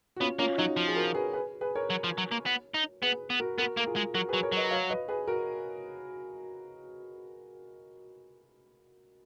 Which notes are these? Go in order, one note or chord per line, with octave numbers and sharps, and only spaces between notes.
F#4
B3 C#4 F4
A#3 C#4 F4
F#3 D#4 F#4
F3
G#4
F#4 A#4
G#4 B4
G#4 B4
G#4 B4
A#4 C#5
F#3
F3
F#3
A#3
B3
D#4
B3 G#4 B4
B3
F#4 A#4
B3 F#4 A#4
A#3 A#4
F4 G#4
G#3
F#3 F#4 A#4
G#4 B4
F#3
A#4 C#5
F#3 B4 D#5
C#5 F5
B4 D#5
G#4 B4
F#4 A#4